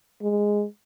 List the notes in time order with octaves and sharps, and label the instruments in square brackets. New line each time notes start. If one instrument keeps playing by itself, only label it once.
[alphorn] G#3